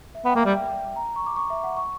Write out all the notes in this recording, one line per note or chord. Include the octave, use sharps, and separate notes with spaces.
E5
B3
G5
A#3
E5
G3
G5
A#5
C#6
D6
C#6
E5
F#5
C#6